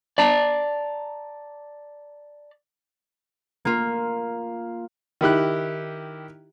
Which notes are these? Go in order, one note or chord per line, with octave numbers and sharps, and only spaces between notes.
D5 A5 A#5
A#3 F4
D#3 E4 G4 F#6